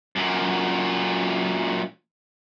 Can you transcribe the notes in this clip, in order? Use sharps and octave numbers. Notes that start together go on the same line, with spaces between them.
F#2 A#2